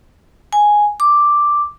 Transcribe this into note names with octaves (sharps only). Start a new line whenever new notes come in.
G#5
D6